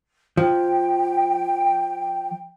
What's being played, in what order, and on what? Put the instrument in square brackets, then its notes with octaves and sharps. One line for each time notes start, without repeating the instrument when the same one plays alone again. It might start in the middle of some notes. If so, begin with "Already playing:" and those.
[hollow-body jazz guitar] F3 [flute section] G5